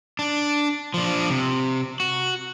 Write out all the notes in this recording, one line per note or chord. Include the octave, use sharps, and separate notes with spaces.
D4
F3 D4
C3
F#4